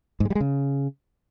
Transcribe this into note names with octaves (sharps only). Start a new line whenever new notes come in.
G#2
G#3
G3
G#3
C#3